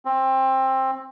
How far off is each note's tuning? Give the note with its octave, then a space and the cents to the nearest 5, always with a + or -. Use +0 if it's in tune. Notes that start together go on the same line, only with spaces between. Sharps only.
C4 +20